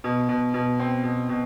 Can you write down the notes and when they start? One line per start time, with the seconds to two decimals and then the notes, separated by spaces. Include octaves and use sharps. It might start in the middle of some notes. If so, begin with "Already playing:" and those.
0.04 B2
0.29 B2
0.54 B2
0.80 C4
1.04 B2
1.29 B2